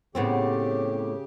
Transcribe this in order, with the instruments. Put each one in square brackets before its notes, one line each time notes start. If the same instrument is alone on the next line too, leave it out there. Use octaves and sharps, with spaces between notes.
[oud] A2 B3 C4 [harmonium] C#3 G4